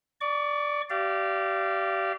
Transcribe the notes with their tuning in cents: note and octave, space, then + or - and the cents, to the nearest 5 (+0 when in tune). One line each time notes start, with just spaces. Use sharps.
D5 +0 C#6 +35
G4 -30 D5 +0 F5 -30